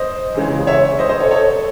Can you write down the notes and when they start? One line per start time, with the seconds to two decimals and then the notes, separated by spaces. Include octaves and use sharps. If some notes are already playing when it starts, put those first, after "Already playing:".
Already playing: C5 D#5
0.35 C#2 C#3 E3
0.67 C#5 E5
0.99 C5 D#5
1.09 C5 D#5
1.20 A4 C#5
1.31 A4 C#5